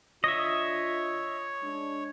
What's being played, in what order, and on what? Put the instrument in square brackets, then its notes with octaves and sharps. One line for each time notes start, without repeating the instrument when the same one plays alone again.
[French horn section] D3 D4 F4 [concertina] C#5 [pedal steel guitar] D#5 E5
[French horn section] G#3 D4